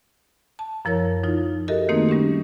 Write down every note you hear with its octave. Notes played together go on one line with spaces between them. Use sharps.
A5
F#2 F3 E4 A#4 C#5
F3 D#4 F4
F#4 G4 A4 A#4 D#5 E5
D#3 A3 A#3 C4 D#4 G#4
G3 C#4 D4 G4